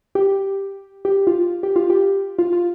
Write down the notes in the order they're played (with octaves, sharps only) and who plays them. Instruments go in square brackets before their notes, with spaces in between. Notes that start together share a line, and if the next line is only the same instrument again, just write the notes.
[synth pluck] G4
G4
F4
G4
F4
G4
F4
F4